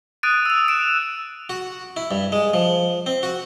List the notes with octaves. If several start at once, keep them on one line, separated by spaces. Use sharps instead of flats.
D#6 F#6 A6 D7 D#7
E6 F7
D7 E7
F#4
E4
G2
G#3
F3
C4
F#4